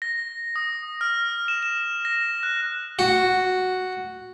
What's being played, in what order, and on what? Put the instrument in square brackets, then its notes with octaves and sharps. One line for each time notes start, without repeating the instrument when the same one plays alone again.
[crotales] A#6
D#6
F6
E7
E7
A#6
F#6
[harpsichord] F#4